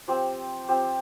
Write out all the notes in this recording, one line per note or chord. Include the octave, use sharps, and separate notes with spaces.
F3 C4 G4
F3 C4 G4